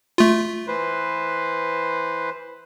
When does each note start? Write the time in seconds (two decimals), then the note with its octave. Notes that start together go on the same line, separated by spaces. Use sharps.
0.18 A3 F4
0.68 E3 B4 C5